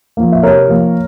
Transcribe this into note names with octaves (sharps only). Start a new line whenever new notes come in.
F3 A#3
E5
C3 A#4 C#5
F3 A#3